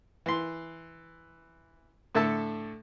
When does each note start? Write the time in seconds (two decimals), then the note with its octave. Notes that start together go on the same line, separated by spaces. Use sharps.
0.26 E3 C6
2.15 A2 D3 A4 E5 A5